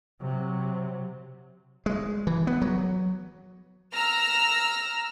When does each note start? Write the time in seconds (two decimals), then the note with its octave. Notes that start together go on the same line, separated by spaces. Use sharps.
0.21 C3 F#3
1.86 G#3
2.27 E3
2.47 B3
2.62 F#3
3.93 A#5 E6 F6 A#6